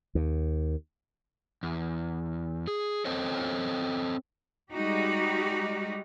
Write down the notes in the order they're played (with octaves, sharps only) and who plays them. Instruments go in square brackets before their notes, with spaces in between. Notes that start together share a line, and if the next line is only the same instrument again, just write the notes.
[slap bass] D#2
[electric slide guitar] E2
G#4
C4 A4 C5 C#5 D#5
[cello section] G3 G#3 D#4 F#4 G4